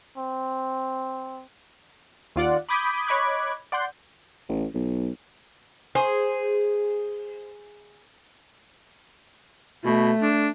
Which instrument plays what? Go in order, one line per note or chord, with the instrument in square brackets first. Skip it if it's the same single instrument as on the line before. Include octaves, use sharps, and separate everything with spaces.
[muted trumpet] C4
[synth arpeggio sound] D#2 F4 D5 F#5
B5 D6 D#6 G6 G#6 B6
C#5 D#5 B5 D6 F#6 G#6
D5 F#5 C6 G6
[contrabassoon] A1
B1
[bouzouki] G#4 [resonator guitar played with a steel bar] C5
[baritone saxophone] B2 [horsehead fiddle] A3
[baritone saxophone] D4